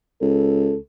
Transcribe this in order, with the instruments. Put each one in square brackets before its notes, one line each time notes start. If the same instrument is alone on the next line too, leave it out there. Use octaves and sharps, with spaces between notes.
[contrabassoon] C#2 [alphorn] A4